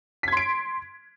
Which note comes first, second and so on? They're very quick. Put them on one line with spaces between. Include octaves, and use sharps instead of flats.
B6 G#6 C6 D7